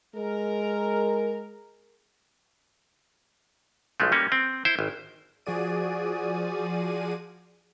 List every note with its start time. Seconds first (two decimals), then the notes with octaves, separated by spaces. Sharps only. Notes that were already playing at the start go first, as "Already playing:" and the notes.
0.16 G#3 A#4
4.00 B1 F3 G#3 A3
4.12 G3 A#3 C#4
4.32 C4
4.65 E4 C5
4.79 G#1
5.46 F3 F#4 G#4 D5 D#7